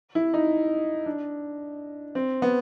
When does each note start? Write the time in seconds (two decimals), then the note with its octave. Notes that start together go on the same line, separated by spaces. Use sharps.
0.15 E4
0.34 D#4
1.06 D4
2.15 C4
2.42 B3